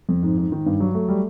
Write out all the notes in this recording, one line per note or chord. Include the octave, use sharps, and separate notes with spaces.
F2
G#2
G#2
D#3
G2
F#3
A3
G3